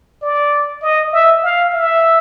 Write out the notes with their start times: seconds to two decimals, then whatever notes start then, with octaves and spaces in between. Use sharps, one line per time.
0.22 D5
0.82 D#5
1.13 E5
1.43 F5
1.73 E5